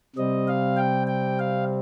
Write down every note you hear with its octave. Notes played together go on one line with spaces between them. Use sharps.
C3 G3 C4 D#5
F5
G5
G5
F5